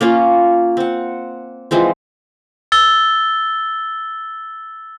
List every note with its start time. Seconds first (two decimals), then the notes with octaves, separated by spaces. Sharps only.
0.01 A#3 C#4 F4
0.77 C4 F#5
1.71 E3 F3 G#3 C4
2.72 E6 A6 G7